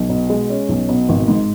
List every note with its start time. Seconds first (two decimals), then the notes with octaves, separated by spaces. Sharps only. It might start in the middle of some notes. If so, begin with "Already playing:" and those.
Already playing: B1
0.10 B2
0.30 G#3
0.49 C#4
0.69 B1
0.89 B2
1.09 G#1
1.28 G#2